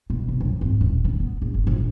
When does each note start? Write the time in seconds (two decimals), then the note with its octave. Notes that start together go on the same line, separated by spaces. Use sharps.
0.10 B2
0.29 C2
0.40 F#2
0.61 G#1
0.81 D#1
1.04 D3
1.19 B3
1.42 A#1
1.54 G1
1.67 A#1